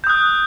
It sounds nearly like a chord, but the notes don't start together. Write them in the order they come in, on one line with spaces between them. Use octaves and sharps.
G6 D#6 F#6